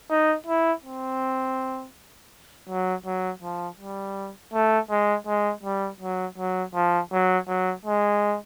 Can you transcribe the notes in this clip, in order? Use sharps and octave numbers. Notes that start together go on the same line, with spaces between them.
D#4
E4
C4
F#3
F#3
F3
G3
A3
G#3
G#3
G3
F#3
F#3
F3
F#3
F#3
G#3